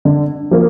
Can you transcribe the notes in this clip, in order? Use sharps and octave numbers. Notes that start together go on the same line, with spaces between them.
D3
F3 A#3